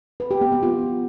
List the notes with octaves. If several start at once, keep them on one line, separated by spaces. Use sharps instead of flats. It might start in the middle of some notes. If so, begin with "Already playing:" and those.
B4
G4
B3
B3
F4